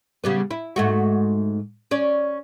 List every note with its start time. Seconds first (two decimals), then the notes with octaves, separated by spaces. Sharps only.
0.24 C#3 G3 B3
0.51 E4
0.76 G#2 A3 F#4
1.91 C#4 D5